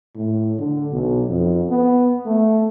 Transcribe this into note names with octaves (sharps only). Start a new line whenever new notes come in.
A2
D3
B1
F2
B3
A3